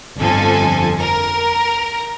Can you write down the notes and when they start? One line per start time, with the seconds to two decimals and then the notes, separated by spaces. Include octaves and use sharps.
0.18 G1 F2 F3 A4 G#5
1.00 A#4